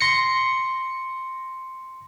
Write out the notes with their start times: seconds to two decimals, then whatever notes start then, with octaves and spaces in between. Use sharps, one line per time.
0.01 C6 A#6 C#7